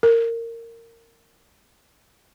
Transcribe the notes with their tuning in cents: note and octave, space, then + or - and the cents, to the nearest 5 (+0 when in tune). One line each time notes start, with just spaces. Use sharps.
A#4 -20